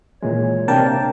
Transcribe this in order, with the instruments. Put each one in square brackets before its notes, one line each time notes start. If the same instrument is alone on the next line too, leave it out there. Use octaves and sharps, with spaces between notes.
[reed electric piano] A#2 E3 G#3 [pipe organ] C#5
[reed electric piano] C3 A#3 D4 [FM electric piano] A#4 G5 A5